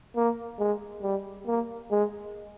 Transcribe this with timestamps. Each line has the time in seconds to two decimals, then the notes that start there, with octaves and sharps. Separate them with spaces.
0.16 A#3
0.59 G#3
1.02 G3
1.47 A#3
1.91 G#3